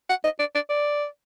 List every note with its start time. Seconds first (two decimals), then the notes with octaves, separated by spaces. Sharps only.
0.10 F#5
0.24 D#5
0.39 D5
0.55 D5
0.69 D5